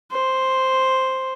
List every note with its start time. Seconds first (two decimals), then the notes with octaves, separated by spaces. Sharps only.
0.12 C5